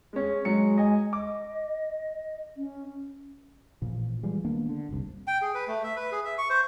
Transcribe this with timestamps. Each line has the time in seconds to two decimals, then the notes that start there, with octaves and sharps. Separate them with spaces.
0.13 G#3 C#4
0.45 F#3 G#3 C#7
0.78 D#5 G#5
1.13 D#5 D6
2.57 C#4
3.82 A1 A#2 F3
4.23 E3 F3 G3 G#3
4.45 D#3 A#3 B3 D4
4.69 D3
4.89 F1 C2
5.27 G5
5.42 G#4
5.54 B4
5.68 A3
5.84 E5
5.96 B4
6.12 G#4
6.25 E5
6.38 C#6
6.50 C5